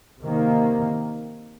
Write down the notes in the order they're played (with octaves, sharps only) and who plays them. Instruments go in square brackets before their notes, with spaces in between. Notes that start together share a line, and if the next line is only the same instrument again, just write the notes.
[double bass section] C3 D#3 A#3